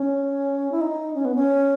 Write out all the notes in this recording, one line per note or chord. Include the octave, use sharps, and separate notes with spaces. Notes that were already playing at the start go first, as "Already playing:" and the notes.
Already playing: C#4
E4
D#4
C#4
B3
C#4